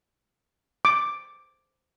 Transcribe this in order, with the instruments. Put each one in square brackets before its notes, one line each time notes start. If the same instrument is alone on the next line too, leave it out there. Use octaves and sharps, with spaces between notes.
[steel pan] D6